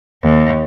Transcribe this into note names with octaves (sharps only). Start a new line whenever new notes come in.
D#2